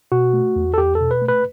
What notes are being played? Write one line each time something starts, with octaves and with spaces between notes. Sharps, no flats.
B2 F#4
A3
E2
A4
E2 G4
A4
B2
B4
A3
B4